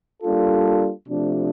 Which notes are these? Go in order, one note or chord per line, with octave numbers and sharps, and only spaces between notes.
G3 A#3 D4 F4 A4
C3 F3 A3 D4